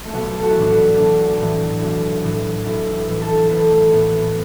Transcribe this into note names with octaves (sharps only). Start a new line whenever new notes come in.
A3
B1 B3
A4
F#4
E4
A2 E3 D4
B3
B1 D4
A2 E3
B1
A2 E3
B1 E4
E4
A2 E3
A4
A1 B4
A3
A2 E3 B3
B3